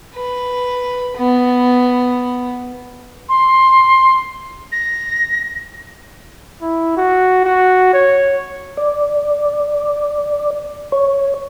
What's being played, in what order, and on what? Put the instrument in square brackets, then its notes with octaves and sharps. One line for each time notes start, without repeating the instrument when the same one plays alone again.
[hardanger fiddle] B4
B3
[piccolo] C6
A#6
[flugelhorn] E4
F#4
F#4
C#5
[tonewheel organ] D5
C#5